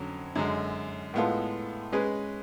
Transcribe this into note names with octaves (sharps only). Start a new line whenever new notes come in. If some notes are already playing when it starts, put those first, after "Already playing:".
Already playing: F2 D3 F#3 C#4
F#2 D3 G#3
A2 G#3 B3 F4 A4
G#3 C#4 G#4 B4